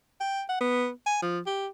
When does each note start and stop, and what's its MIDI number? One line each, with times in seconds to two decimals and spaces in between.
0.21 0.43 79
0.49 0.60 78
0.61 0.89 59
1.06 1.18 80
1.22 1.40 53
1.46 1.67 67